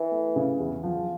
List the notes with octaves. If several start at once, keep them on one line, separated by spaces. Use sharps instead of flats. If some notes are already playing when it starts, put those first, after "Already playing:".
Already playing: E3
A3
C#3
E2
F3